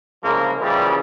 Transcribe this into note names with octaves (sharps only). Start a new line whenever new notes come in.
C2 C#3 F3 G#3 A#3 A#4
A#2 C#3 E3 F3 G3